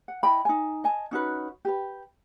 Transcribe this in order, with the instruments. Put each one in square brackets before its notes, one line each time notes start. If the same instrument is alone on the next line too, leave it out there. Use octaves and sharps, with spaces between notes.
[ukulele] F#5
E4 D#5 G5 B5
D#4 G#5
D#5 G#5 A5
C#4 D#4 F#4 B4
G4 B4